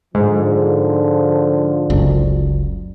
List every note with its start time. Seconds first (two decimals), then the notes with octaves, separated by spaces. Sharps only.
0.15 G#2 D3 F3
1.90 F#1 C#2 F#2